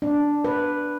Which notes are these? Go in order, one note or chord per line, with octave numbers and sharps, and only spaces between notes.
D4
B4